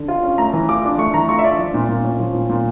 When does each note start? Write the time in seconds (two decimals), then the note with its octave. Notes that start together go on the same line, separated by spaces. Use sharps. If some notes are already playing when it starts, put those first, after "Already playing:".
Already playing: D3
0.08 F4
0.23 C#4
0.38 A3 A#5
0.53 E3
0.69 F4 D6
0.84 D4
0.98 A3 C#6
1.14 E3 A#5
1.29 F4 C#6
1.39 E5
1.44 D4 D5
1.59 F3
1.74 A#2
1.89 A#2
2.04 C#4
2.19 F3
2.35 A#2
2.50 A#2